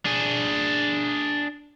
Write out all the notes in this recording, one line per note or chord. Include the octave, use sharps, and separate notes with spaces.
D4 G#4